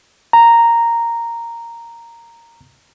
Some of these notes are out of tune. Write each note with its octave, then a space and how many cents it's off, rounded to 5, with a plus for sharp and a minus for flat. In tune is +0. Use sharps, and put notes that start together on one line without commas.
A#5 -5